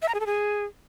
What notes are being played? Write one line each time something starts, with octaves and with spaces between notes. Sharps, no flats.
E5
A#5
G#4
A4
G#4